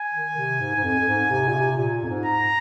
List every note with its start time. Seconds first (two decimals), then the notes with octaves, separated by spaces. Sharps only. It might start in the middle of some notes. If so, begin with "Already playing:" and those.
Already playing: G#5
0.14 D#3
0.37 C3
0.60 G#2
0.76 G#2
0.84 F2
0.99 F2
1.08 G#2
1.30 C3
1.48 A#2
1.55 C3
1.77 A#2
2.04 F2
2.09 G#2
2.25 A#5